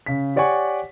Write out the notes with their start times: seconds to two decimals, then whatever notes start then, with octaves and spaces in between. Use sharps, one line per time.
0.06 C#3 B6
0.36 G4 C#5 D5 F#5 G#5 C#6